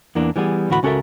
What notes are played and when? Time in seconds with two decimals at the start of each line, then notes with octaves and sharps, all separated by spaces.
0.15 E2 E3 A#3 D4
0.36 E3 G3 B3 G#4
0.69 D2 A2 E3 F#4 A4 B5
0.83 C#2 C#4 F#4 A4 A#4 E5